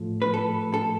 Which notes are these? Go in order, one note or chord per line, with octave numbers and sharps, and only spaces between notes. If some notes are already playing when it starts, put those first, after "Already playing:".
Already playing: A2 F3 A3
B4
A4
A4